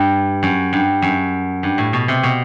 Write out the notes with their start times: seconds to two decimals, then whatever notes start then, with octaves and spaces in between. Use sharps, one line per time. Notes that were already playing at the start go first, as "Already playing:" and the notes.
Already playing: G2
0.43 F#2
0.73 G2
1.02 F#2
1.63 G2
1.78 A2
1.93 B2
2.08 C3
2.23 B2